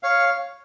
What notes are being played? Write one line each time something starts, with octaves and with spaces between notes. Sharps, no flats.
C#5 F5